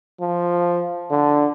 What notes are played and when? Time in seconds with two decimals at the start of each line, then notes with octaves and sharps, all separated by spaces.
0.20 F3
1.11 D3